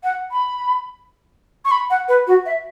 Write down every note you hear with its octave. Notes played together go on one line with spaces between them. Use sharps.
F#5
B5
C#6
B5
F#5
B4
F#4
E5